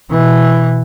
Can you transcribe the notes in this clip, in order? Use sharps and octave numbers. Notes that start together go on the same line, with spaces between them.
B2 E3